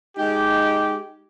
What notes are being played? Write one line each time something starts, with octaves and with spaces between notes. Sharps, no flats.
G#3 D#4 G4